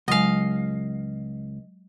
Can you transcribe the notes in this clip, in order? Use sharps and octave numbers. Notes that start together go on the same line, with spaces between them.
C#2 F#3 G#3 D#5 F5